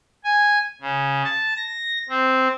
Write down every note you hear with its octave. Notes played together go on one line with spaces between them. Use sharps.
G#5
C#3
A5
A#6
C4